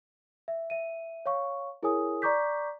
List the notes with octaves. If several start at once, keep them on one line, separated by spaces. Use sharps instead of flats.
E5
E5 D#7
C#5 F5 C#6
E4 G#4 A#4 C#5 G#5 D#6
D5 A#5 C#6 D6 G6 B6